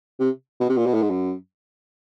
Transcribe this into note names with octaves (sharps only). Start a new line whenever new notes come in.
C3
B2
C3
A#2
B2
A2
G#2
F#2